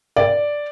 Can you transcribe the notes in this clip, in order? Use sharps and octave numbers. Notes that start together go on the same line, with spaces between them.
D5